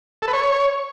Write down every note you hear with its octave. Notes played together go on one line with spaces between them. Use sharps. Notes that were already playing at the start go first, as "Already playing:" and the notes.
A4
B4
C#5